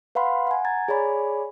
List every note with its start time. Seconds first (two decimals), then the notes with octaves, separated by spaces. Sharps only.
0.15 B4 F5 F#5 B5 C6
0.47 F#5 G#5
0.65 A#5 G#6 A6
0.88 G#4 C#5 D5 G#5 B5